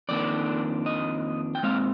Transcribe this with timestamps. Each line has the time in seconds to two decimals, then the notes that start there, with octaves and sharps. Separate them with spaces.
0.09 F2 D#3 A#3 D4 D5
0.86 D#5
1.55 G5
1.63 A#2 G#3 C4 F5